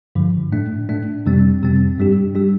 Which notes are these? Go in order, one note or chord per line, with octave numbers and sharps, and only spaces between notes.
G2 D3 F3
A2 A3 D4
A2 A3 D4
F2 C3 G3 C4
F2 C3 G3 C4
G2 G3 D4 G4
G3 D4 G4